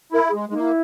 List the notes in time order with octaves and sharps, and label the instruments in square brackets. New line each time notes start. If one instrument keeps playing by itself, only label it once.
[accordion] E4 [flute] A#4
[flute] G#4
[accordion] G#3
[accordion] G#3 A#3 [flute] D#4
[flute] E4